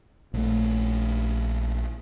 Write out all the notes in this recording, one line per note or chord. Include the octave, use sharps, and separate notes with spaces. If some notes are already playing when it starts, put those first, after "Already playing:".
A#1 A3